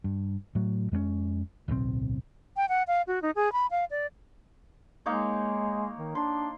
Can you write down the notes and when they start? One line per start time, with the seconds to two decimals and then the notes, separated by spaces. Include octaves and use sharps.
0.04 G2
0.55 A2 F#3
0.92 F2 G#3 A#3 C#4
1.68 D1 B1 A#2 C4
2.56 G5
2.69 F#5
2.87 F5
3.07 F#4
3.22 D#4
3.35 G#4
3.52 B5
3.71 F5
3.91 D5
5.06 G#3 A#3 D#4 C#5
5.97 D#3
6.15 D4 C6